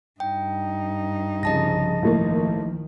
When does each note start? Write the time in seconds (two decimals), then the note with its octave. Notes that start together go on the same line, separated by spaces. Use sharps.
0.20 G2 D#4 G5
1.43 C2 C#3 F3 D#5 A5 A#6
2.02 A1 D#3 F3 A3 A#3